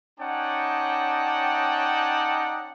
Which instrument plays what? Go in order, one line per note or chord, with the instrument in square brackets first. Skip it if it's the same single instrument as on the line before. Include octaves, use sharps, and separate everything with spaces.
[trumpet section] C#4 D#4 D5 F#5 G5 A5